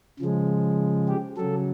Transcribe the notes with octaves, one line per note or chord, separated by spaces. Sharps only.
C#3 F3 G#3
G4
C#3 F#3 A4